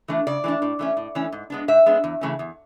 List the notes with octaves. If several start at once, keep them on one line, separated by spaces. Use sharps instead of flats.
E3 A3 D4
C#3 D5
E3 A3 D4
A2
E3 A3 C#4
A2
E3 A3 C#4
G#2
G#3 B3 D4
G#2 E5
G#3 B3 D4
E2
C#3 E3 A3 C#4
E2